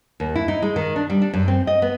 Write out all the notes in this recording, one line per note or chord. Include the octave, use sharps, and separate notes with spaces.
D#2
E4
D#4
G#3
D#3
D4
G3
D4
F#2
C4
D#5
B3